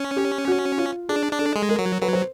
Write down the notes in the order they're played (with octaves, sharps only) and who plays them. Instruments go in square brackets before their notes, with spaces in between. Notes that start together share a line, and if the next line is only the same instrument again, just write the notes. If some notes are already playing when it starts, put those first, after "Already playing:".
Already playing: [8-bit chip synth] C#4
[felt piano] G4
F#4
F4
[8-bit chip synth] D4 [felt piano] G#4
[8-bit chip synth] D4
[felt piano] A4
[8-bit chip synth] G#3
[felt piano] A#4
[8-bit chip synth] F#3
[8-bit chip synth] F#3 [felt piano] B4
[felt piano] C5